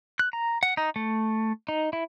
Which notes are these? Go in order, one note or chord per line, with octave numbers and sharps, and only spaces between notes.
F#6
A#5
F#5
D#4
A3
D#4
E4